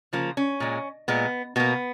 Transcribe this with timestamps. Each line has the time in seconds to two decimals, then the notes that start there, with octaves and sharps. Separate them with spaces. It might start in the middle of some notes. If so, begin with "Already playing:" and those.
0.13 C#3 F3 A#3
0.37 C#4
0.60 A#2 G#3
1.08 A#2 G#3 B3
1.56 B2 A#3 B3